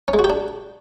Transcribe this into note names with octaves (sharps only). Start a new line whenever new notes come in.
C#4
G#3
F#4
G4
D4